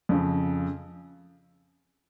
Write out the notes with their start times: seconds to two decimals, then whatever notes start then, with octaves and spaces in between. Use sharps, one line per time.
0.09 F2 C#3